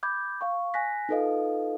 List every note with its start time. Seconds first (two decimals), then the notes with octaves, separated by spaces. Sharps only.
0.03 B5 D6 G6 G#6
0.41 F5 G5 C#6
0.74 G#5 F#6 A#6 B6
1.09 D#4 F4 A4 B4 D#5 F5